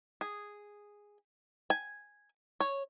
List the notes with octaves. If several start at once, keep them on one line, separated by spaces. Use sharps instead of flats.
G#4
G#5
C#5